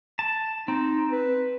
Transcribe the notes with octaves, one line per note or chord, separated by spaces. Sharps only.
A5
C4 D#4
B4